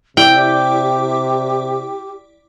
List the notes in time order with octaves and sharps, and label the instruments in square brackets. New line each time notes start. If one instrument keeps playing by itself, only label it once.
[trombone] C3 [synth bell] E4 D5 D6 [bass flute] G4 [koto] G5